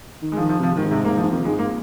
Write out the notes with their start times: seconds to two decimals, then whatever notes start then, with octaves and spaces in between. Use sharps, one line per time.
0.22 D#3
0.32 G#3
0.37 F3
0.40 D#3
0.49 F3
0.59 C3 F3
0.77 G#2 D#3
0.91 C3
1.05 A#3
1.17 F3
1.23 G#2
1.31 F2 D#3
1.45 G#3
1.49 G#2
1.59 A#3